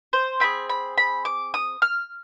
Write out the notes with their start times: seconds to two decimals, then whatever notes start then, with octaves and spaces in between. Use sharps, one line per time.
0.13 C5
0.40 C4 D#4 G#4 B5
0.70 B5
0.98 B5
1.25 D6
1.54 D#6
1.82 F6